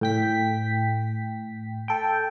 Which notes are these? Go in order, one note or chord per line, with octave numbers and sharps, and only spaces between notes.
A2 G5 B6
A4 G5